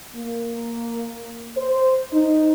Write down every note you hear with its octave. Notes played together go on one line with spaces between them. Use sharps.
A#3
C5
D#4